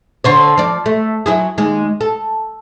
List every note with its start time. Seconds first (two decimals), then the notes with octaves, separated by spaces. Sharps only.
0.24 D3 C5 C#5
0.58 F3 D5
0.86 A3
1.26 F#3 E4 G#4
1.58 D#2 G#3
2.01 A4